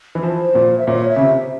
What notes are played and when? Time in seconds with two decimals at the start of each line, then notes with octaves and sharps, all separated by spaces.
0.15 E3
0.23 F3 C5
0.55 A#2
0.78 E5
0.87 A#2 C#5
1.09 E5
1.16 C#3
1.21 C3